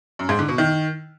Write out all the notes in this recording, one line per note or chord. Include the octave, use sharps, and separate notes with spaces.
F#2
G#2
D3
B2
D#3